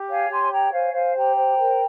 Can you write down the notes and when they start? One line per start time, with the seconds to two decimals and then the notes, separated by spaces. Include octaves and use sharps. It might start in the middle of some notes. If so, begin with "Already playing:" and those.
Already playing: G4
0.09 C#5 F5 G#5
0.30 G4 G#5 C6
0.41 G#5
0.51 C#5 G5 A#5
0.72 C5 F5 G#5
0.94 C5 F5 G#5
1.15 G4 G5 A#5
1.36 C5
1.57 A#4